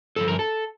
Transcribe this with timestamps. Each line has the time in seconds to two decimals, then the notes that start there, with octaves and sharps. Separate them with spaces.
0.16 G2 D3 F3 A4
0.28 A#4
0.39 A4